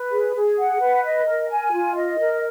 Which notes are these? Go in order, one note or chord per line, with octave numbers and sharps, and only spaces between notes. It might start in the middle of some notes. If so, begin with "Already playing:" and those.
Already playing: B4
G#4
G#4
F#5
B4
D#5
A#4
G#5
F4
D#5
A#4